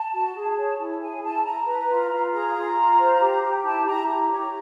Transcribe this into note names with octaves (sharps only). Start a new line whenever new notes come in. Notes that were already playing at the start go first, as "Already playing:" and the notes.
Already playing: A5
F#4
G#4
C#5
E4
G#4 G#5
E4 A5
E4 A#5
B4
F4
F4
G#4 A#5
F4
F4
C5
G4
G4
E4 A5
E4 A#5
G4 A#5
C#5 A#5